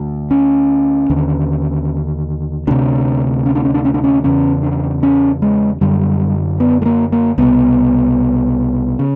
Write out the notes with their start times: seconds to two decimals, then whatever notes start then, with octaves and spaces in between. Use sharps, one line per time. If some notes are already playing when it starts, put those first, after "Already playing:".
Already playing: D2 D3
0.31 C#4
1.10 D#2 D3
2.67 D2 C3 D4
3.46 C#4
3.55 D4
3.65 C#4
3.74 D4
3.85 C#4
3.94 D4
4.04 C#4
4.24 E2 C#3 C#4
4.63 D4
5.03 C#4
5.42 G#3
5.81 F#2 D3 G3
6.60 B3
6.82 A3
6.86 A#3
7.12 A#3
7.38 C2 B2 B3
8.99 C#3